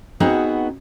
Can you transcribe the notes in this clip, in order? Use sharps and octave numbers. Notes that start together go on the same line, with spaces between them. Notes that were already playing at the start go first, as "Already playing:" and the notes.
B3 C4 D#4 F#4 G#4 B4